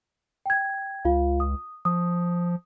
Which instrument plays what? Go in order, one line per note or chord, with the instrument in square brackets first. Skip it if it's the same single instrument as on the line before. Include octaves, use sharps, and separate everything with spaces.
[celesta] G5 G#6
[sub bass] C#2 [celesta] F4 F5
[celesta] D#6
[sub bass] F3 [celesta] D#6